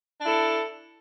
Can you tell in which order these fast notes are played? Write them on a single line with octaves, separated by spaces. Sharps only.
D4 E4 A4